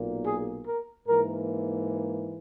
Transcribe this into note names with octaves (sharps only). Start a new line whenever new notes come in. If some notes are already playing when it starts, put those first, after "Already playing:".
Already playing: B1 A#2 A#3
G#4
A#4
G#2 E3 A#3 A#4